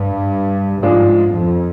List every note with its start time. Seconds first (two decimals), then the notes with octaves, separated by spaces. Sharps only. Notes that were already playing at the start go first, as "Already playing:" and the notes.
Already playing: G2
0.82 G#2 F3 G#3 D4 F4
1.33 F2